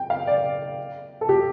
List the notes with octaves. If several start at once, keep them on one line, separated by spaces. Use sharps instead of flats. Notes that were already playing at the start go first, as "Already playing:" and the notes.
Already playing: G5
F5
D5
A4
G4